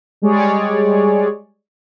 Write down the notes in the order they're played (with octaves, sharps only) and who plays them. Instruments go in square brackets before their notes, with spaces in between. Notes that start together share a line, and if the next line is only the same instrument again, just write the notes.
[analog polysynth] G3 G#3 G#4 C#5 D5